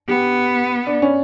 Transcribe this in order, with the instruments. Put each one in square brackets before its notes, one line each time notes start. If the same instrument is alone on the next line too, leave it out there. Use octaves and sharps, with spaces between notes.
[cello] B3 [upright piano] G4
[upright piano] D4
C#4